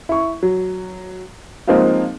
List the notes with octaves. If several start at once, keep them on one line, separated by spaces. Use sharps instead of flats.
E4 C#6
F#3
F3 G#3 A#3 C4 D#4 F4